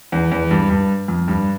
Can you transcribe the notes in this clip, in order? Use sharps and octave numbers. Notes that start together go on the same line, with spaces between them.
E2
E2
G2
G2
F2
G2